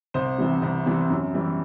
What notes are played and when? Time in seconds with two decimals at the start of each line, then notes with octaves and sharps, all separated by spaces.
0.14 C2 C5
0.38 C3 E3 G3
0.62 C2
0.86 C3 E3 G3
1.10 F#2
1.34 E3 G3